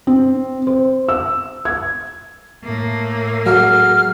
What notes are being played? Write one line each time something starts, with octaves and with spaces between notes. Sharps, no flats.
C4
C5
E6
G#6
A2 A#3
F#3 G#3 F#4 A4 F6